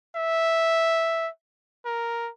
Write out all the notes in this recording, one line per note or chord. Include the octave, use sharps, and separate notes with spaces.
E5
A#4